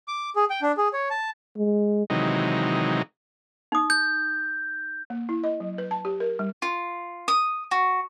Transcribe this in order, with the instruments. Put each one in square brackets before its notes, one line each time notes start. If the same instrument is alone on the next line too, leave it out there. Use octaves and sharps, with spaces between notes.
[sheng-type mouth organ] D6
G#4
G5
D4
G#4
C#5
A5
[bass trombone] G#3
[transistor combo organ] C3 D#3 E3 F#3 G#3 D#4
[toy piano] D#4 D#6
[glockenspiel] G6
[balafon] A#3
E4
D#5
F#3
B4
A5
G4
A#4
G3
[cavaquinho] F4
D#6
F#4